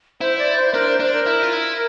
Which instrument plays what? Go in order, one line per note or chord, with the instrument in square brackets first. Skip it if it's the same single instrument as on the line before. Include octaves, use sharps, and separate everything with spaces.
[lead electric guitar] E4 [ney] C5
[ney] D5
C5
[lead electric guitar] D4 [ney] A#4
[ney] C5
[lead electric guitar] D4 [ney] C5
[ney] A#4
[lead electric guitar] E4
F4
E4